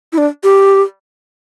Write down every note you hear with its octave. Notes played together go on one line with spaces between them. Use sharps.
E4
D4
G4